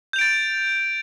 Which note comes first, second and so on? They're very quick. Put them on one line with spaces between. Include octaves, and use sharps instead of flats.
G6 F7 D7 A6